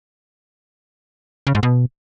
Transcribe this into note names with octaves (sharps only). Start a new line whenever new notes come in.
C#3
G#2
B2